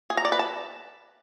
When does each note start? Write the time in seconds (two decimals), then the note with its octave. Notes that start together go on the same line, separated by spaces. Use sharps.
0.10 G#4
0.17 A#5
0.25 D5
0.32 B4
0.39 A5